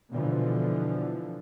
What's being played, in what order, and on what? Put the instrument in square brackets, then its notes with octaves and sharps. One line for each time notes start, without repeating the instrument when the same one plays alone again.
[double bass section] B2 D3 E3 F3